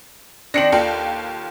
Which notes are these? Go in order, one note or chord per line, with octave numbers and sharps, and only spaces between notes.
D#3 C4 D4 A#6 C#7 F#7
D#2 F4 A4 G5